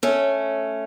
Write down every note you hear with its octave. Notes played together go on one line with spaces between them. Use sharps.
A3 C#4